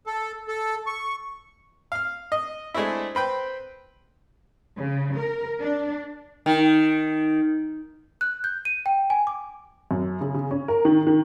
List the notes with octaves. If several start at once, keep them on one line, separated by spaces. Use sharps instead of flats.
A4
A4
C#6
F5 F6
D#5
G#3 A3 C4 D4 E4
C4 B4 G5
C#3
A#4
D4
D#3
F#6
G6
D#7
G5
G#5
D6
F#2
C#3
C#3
C#4
A#4
D#3
D#3